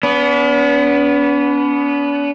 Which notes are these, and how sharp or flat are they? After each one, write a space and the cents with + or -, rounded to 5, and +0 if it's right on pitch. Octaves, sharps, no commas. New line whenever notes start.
B3 +0 D4 -45